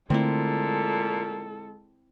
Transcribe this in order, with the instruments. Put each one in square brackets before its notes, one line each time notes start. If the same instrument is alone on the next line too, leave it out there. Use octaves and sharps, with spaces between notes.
[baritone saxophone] A#2 [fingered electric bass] D3 A3 [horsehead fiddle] G#3 A4 [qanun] C4 E4